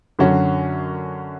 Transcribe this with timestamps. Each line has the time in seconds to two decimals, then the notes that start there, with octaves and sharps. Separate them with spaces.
0.19 F#2 D3 F#3 C#4 F#4